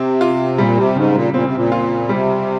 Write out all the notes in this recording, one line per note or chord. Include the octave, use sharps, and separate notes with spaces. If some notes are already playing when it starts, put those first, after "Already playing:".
Already playing: C3 C4
F4
A#2 G3
C3
G#2 C#3
A#2
A#2 C4
C3
A#2
F4
C3 G3